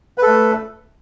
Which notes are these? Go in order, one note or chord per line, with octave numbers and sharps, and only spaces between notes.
A3 A4 B4